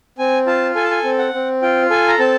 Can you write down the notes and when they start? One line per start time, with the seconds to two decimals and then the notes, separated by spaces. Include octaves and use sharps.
0.19 C4 G#5
0.47 F4 A5
0.75 A4 G#5
0.84 A5
0.91 G#5
1.04 C4
1.18 F#5
1.34 C4
1.62 F4 G5
1.90 A4 G#5
2.08 A#5
2.19 C4 A5